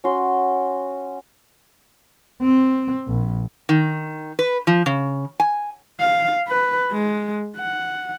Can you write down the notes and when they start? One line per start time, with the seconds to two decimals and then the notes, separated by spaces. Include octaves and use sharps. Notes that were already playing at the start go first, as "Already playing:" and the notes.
0.04 C#4 F#4 C6
2.42 C4
3.08 A#1
3.69 D#3
4.39 B4
4.67 F3
4.86 C#3
5.40 G#5
6.00 F5
6.49 B4
6.92 G#3
7.57 F#5